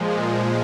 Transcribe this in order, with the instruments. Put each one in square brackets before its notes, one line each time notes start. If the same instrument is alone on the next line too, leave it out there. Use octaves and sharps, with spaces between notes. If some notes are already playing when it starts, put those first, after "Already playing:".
Already playing: [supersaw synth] A#2 F3 G#3